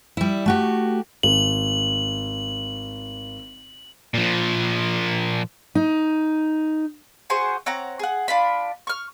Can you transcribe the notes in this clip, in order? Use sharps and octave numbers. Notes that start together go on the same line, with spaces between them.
G3 E4
A3 F#4 G4
G#1 F#7
A#2 F3
D#4
F#4 G#4 C5 C#6
C4 C#5 F#5 A#5
G#4 F#5
D4 F4 B5
C#6 F6